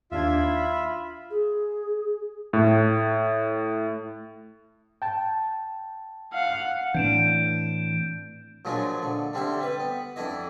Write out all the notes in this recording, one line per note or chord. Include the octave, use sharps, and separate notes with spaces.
D#2 D4 F4 E5 G#6
B5
G#4
A2
G5 A5
F5 F#5
A2 E3 C4 D4 G6 D7 E7
A#2 F3 F#3 G#3 D4
D3
D3 G3 C4 D4 E4
G3 B4
B3
F2 D4 E4 D#5